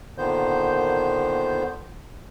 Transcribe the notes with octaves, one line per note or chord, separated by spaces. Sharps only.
A#2 D3 D#3 B3 C5 G6